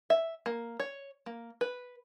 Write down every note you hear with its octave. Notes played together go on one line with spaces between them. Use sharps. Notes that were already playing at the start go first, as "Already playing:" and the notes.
E5
A#3
C#5
A#3
B4